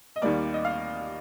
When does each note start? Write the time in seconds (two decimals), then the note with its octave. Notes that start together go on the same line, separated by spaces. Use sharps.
0.16 D#5
0.22 D#2 D#3 G3 A#3 D5
0.54 D#5
0.64 F5